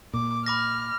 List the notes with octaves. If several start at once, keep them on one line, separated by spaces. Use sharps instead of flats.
A#2 D6
B5 D6 F6 A#6